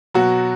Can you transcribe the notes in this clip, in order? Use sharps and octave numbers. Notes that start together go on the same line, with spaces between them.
B2 F#3 F#4